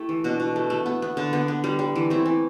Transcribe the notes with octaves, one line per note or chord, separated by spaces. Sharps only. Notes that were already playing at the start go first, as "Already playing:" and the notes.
Already playing: A3 E4 G4
E3
B2 D4 F#4
B2
A3
A3
B3
B3
D3
B3
B3
G3
G3
E3
A3 C4 E4
E3